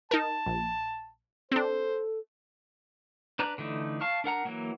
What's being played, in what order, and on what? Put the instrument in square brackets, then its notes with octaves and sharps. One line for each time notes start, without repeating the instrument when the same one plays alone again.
[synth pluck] D#4 A#4 [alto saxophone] A5
[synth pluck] A#1
[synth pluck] C4 D4 [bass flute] A4 [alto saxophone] C5
[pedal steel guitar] D4 B4 A#5 F#6
D3 E3 A3 D#4
F5 A5 C#6 F6
D4 A#4 F#5 A#5
E3 F#3 A#3